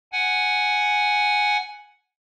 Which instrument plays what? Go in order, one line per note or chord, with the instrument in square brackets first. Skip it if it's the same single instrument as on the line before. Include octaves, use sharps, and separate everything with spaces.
[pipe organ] F#5 G#5